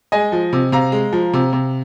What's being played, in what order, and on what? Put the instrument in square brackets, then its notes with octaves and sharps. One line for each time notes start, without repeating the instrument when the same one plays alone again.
[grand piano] G#3 D#5 G#5
F3
C3
C3 F5 A#5
G#3
F3
C3
C3